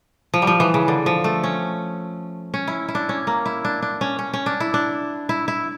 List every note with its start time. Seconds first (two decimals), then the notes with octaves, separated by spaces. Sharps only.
0.34 F3
0.42 G3
0.47 F3
0.60 E3
0.74 C#3
0.88 D3
1.06 F3
1.24 A3
1.44 C#4
2.54 C#4
2.68 E4
2.88 E4
2.95 D4
3.09 C#4
3.27 A#3
3.46 E4
3.65 D4
3.82 D4
4.01 C#4
4.19 C#4
4.34 C#4
4.46 D4
4.60 E4
4.74 D4
5.29 E4
5.48 E4